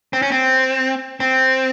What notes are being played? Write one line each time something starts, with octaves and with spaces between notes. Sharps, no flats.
C4
C#4
C4
C4